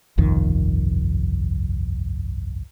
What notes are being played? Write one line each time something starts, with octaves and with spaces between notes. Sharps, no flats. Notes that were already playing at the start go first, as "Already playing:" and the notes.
G1 C2 F2 D#3